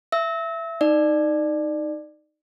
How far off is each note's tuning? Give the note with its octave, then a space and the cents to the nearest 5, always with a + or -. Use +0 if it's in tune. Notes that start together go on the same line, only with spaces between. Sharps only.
E5 +20 E6 -30
D#4 +0 D5 +20